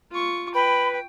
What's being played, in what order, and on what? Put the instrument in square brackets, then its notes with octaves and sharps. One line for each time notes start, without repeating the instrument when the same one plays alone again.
[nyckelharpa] F4 C#6
[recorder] B4 [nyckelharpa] G5 [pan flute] B5